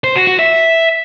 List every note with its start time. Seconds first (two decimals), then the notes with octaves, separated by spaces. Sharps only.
0.04 C5
0.16 F#4
0.27 F#4
0.39 E5